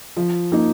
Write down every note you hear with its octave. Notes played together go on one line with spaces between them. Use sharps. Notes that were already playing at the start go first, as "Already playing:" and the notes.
F3
A#3 D#4